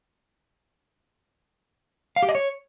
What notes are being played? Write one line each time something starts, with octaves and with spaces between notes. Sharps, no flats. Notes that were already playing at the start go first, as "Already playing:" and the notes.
F5
G4
D#5
C#5